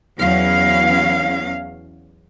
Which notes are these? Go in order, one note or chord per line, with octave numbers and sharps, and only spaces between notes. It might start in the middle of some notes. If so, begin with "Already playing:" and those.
E2 F#3 C#4 F5